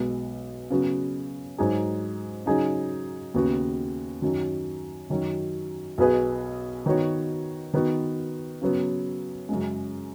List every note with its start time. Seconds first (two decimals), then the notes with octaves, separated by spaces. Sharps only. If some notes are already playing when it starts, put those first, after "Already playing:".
Already playing: B1 B2 G#3 B3
0.70 C#3 F#3 B3 F#4
1.58 G#2 F#3 D#4 G#4
2.46 C#3 F#3 D#4 G#4
3.34 D#2 C#3 B3 F#4
4.22 F#2 D#3 F#3
5.10 F#2 D#3 F#3 C#4
5.98 B1 B2 B3 G#4 B4
6.86 D#3 B3 F#4 C#5
7.74 D#3 B3 F#4
8.62 C#3 F#3 B3
9.49 F#2 C#3 G#3